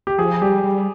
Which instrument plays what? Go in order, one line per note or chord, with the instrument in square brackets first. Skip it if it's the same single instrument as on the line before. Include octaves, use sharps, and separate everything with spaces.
[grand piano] G4
[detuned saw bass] F3 [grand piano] G#4
[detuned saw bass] G3 [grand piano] G4
[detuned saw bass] G3